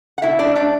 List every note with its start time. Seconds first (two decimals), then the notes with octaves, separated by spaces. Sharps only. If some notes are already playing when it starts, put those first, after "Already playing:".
0.18 F#5
0.22 B2 E4 E5
0.39 D4 D5
0.55 A3 D4 D5